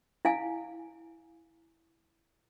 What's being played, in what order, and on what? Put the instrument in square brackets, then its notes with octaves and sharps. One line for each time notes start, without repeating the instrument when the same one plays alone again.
[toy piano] E4 F5 G#5